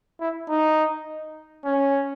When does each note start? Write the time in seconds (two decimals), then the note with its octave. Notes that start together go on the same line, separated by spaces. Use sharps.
0.20 E4
0.49 D#4
1.65 C#4